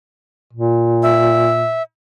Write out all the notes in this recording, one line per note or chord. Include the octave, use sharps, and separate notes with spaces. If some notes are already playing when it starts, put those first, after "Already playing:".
A#2
E5